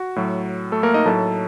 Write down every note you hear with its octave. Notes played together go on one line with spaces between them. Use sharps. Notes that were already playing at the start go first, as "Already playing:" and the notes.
Already playing: F#4
A2 F#3
A3 A4
A#3 A#4
D#4 D#5
A2 F#3 A4 A5